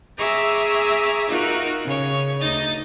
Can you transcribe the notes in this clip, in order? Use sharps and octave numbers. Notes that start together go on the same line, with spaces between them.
G#4 E5 A#5 C#6 D6 E6
D#4 F4 F#4 A#4
C#3 C#5
D2 D#4 D#5 A6